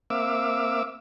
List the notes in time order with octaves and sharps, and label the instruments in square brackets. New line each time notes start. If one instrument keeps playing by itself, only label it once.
[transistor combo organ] A#3 C4 E5 F5 D6 E6